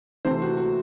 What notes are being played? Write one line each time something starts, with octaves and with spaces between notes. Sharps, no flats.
C3 E3 A3 C4 C5
F#4
F#4